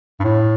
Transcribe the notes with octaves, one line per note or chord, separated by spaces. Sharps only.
G2
A2